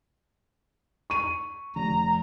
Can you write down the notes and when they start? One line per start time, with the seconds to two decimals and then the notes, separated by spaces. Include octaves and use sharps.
1.10 C#6 D#7
1.76 F1 A#5